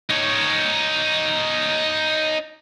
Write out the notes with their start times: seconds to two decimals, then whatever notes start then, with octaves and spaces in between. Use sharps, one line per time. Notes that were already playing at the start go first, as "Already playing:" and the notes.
0.10 D#4 C#5